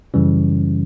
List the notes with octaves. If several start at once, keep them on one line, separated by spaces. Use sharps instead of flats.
F#2 C#3 E3 G3 C#4